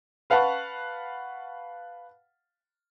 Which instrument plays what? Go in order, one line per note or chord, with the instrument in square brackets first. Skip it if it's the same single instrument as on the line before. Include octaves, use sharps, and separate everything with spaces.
[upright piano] B4 F5 F#5 A5 B5 C#6